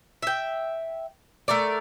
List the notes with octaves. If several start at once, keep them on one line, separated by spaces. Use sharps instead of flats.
E5 G5
A3 A#4 D5